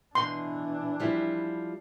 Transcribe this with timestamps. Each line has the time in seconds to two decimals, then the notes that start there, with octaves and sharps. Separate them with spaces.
0.15 B2 E3 D4 C6
1.00 F3 G3 E4